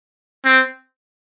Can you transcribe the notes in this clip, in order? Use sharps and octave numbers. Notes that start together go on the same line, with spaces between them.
C4